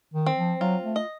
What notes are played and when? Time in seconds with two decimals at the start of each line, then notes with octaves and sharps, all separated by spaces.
0.14 D#3
0.26 C4
0.37 F3
0.60 F#3 F4
0.84 A3
0.96 D#5